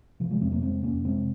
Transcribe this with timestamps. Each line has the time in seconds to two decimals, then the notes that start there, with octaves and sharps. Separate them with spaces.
0.20 C3 F3
0.31 F3 G#3
0.41 F2 G#3 C4
0.51 F#3 A#3
0.62 C3 G#3 C4
0.83 F2 A#3 C#4
1.05 C3 G#3 C4